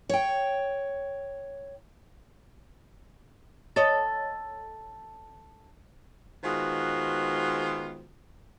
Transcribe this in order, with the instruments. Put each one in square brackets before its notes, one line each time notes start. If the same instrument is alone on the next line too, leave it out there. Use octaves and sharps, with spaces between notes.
[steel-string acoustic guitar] C#5 G5
[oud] A4 C#5 D#5
[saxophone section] D#3 G#3 B3 F4 F#4 C5